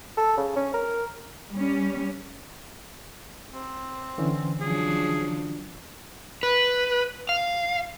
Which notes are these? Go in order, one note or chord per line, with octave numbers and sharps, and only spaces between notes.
A4
C#3
C#4
A#4
G3 C#4
C4
D3 E3 C#4
F3 F#3 D4 G#4
B4
F5